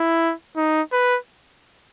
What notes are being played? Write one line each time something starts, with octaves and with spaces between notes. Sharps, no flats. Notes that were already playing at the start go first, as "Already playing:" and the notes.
Already playing: E4
D#4
B4